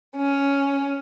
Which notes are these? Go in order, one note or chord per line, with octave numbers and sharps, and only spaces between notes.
C#4